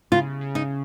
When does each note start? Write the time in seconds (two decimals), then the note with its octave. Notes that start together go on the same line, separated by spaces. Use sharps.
0.11 C#3 F4
0.41 C#3
0.55 D#4